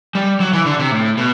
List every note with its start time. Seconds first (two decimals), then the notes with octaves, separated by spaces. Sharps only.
0.15 G3
0.40 F#3
0.53 E3
0.66 D3
0.79 C3
0.92 A2
1.17 B2